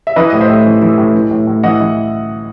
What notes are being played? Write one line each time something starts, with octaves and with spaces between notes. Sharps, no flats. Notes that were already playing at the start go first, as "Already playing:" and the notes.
E5
E3 B4 D#5
A2 D#5
C5 E5
A2
E3
E3
A2
E3
A2
A2
E3 D#5 F#5
E3